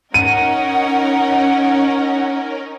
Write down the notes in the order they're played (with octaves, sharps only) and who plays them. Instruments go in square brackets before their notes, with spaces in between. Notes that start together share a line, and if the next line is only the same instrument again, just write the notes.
[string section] C#4 D#4 A#4 [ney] F#5 [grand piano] D#7